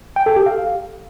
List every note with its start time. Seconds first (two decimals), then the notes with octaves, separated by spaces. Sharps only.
0.16 G5
0.26 A4
0.36 G4
0.46 F5